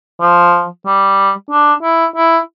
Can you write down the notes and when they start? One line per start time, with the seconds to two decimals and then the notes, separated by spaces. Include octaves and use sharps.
0.21 F3
0.86 G3
1.50 D4
1.83 E4
2.16 E4